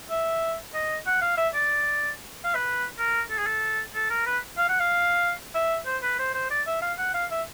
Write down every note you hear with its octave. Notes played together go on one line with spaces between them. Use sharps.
E5
D#5
F#5
F5
E5
D5
F5
B4
A#4
A4
G#4
A4
A4
A#4
B4
F5
F#5
F5
E5
C5
B4
C5
C5
D5
E5
F5
F#5
F5
E5